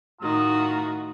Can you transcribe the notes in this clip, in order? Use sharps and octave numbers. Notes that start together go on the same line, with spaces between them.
A2 D#3 F4 F#4 A#5 D#6